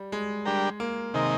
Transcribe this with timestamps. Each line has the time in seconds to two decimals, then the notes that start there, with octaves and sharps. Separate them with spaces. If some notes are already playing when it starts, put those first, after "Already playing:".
Already playing: G3
0.12 G#3
0.45 G3 D4 G4 A#4
0.80 A#3
1.14 C3 D#3 G#3 D#4 A#4